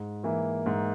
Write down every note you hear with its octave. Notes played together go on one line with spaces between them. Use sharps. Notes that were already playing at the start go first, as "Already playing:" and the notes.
Already playing: G#2
E3 A#3
G#2